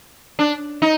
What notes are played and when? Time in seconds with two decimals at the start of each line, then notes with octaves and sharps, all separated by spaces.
0.39 D4
0.82 D#4